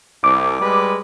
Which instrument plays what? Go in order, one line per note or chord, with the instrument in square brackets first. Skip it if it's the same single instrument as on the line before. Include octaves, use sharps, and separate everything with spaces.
[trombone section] C2 [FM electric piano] D6
[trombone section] G3 G#3 B4